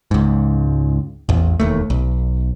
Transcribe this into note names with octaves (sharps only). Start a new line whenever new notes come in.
C#2 G#2
A1 E2
E1 D#2 A3
B1